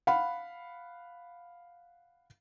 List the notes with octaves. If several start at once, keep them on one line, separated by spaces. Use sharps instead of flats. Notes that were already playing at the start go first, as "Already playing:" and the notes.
F5 F#5 B5